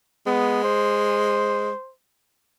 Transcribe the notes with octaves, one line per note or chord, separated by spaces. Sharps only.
G#3 B3
C5